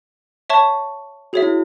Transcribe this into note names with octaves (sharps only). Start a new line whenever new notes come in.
C#5 E5 A5 C#6
F#4 G#4 C#5 E5
E4